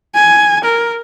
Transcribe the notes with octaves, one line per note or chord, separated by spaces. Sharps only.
G#5
A#4